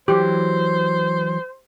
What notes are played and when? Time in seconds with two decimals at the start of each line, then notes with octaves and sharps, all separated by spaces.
0.08 E3 F#3 G4 C5